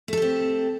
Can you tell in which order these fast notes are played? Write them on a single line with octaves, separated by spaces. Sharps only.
A3 A4 G4 C4